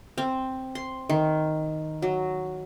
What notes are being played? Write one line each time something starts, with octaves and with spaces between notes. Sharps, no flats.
C4
C6
D#3
F#3